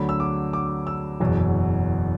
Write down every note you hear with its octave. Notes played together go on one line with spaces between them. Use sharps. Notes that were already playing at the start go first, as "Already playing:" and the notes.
Already playing: D2 D3 F#3 B5
E6
D6
D6
E6
F#1 E2 B2 F#3